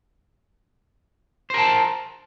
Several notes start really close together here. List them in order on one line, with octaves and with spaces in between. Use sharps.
C5 A#4 A5